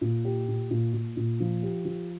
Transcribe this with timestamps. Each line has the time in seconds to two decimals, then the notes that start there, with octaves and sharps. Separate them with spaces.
0.01 A#2
0.25 G4
0.48 A#2
0.71 A#2
0.93 A#2
1.17 A#2
1.40 F3
1.63 G4
1.85 F3